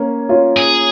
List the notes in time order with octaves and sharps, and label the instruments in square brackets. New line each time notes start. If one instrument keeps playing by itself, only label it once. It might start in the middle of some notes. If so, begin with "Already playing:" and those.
Already playing: [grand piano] A#3 C#4
C#4 F4
[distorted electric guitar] G#4